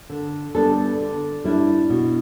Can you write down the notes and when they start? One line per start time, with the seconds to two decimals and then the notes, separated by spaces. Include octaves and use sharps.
0.10 D3
0.55 G3 B3 D4 A4
1.00 D3
1.44 G3 D4 E4
1.90 B2